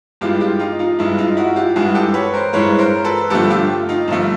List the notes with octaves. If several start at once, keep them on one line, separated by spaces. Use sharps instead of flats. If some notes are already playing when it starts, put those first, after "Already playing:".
G2 E3 G#3 F4 G4
F4 G4
D#4 F4
D#4 F4
G2 E3 G#3 E4
D#4 F4
E4 F#4
F4 G4
G2 E3 G#3 F#4 G#4
G4 A4
B4 C#5
A#4 C5
G2 E3 G#3 B4 C#5
A#4 C5
A4 B4
G2 D3 F3 A3 G4 A4
F4 G4
D#4 F4
G2 D3 F3 A3